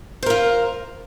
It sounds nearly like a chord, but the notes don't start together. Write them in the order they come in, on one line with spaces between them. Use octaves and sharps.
C5 A#4 F4